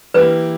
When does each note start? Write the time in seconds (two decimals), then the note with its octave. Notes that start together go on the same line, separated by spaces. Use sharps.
0.14 E3 A#3 E4 G4 B4